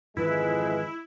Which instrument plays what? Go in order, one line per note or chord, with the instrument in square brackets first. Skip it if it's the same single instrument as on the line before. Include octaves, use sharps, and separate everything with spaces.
[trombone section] F2 G#3 [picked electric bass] G#2 D#3 E3 [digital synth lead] E4 [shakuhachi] B4